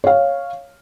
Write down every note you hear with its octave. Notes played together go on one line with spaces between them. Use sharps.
C#5 F5